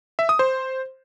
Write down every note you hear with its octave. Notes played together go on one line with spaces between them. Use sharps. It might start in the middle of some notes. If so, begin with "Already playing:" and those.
E5
D#6
C5